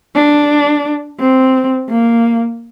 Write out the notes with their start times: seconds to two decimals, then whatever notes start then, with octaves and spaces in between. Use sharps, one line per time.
0.15 D4
1.19 C4
1.89 A#3